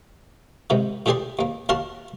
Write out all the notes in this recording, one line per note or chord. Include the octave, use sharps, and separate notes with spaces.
G#2 C3 D#3
A2 E3 G4 G#4 D5 C6
D#2 A#3
D#2 F#4 A#4 F5 A5 C6